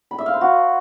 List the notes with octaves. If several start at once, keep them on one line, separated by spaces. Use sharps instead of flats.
B5
E5
F5
C5
F#4